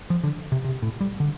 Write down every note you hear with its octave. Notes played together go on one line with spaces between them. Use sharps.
F3
D3
C3
C3
A2
G3
D3